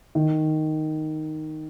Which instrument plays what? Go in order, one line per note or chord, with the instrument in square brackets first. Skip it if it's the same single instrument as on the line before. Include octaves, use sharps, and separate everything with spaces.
[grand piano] D#3